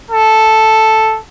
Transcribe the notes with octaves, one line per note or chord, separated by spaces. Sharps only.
A4